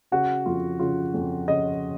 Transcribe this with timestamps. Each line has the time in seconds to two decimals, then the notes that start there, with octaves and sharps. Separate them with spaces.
0.12 C#3 F#4
0.46 F2 F4
0.79 C#3 F4
1.14 F2
1.47 C#3 D#5